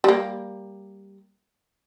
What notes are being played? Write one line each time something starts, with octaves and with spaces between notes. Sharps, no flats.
G3 A#3